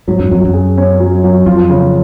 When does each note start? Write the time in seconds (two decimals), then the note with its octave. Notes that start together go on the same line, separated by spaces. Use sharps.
0.08 G#2 F#3
0.19 F#2
0.31 F2 F#3
0.45 F#2
0.54 G#4
0.77 C#4
1.00 F#3
1.24 F#3
1.46 F2 F4
1.69 C#3